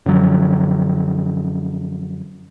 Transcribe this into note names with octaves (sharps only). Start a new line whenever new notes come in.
F#2 D3 F3 F#3